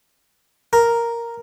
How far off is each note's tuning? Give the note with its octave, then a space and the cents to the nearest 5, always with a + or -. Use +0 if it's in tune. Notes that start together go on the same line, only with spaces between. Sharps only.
A#4 +0